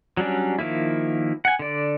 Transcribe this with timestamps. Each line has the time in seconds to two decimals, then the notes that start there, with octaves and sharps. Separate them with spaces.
0.17 F#3 G3 C#4 D4
0.59 D#3 F3 A#3 E4
1.45 F#5 G#5
1.59 D3 D5